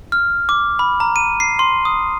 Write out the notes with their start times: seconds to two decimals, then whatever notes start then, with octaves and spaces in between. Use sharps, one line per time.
0.12 F6
0.49 D6
0.79 B5
1.00 A#5
1.16 D#7
1.40 C7
1.59 C6
1.85 D#6